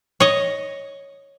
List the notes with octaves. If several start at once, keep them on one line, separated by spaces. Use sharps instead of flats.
C#5 D#5